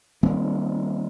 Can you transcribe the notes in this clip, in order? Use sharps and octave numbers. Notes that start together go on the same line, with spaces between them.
D#3 G3 A#3 C4